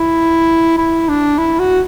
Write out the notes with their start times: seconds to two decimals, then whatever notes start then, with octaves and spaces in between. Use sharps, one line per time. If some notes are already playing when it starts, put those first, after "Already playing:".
Already playing: E4
0.78 E4
1.09 D4
1.38 E4
1.59 F#4